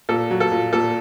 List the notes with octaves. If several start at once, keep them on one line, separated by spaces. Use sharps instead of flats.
A#2 A4
F#3
A4
A#2
A#2 A4